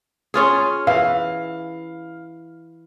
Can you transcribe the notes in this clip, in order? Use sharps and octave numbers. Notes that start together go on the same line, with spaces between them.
C#4 F4 G#4
E3 F5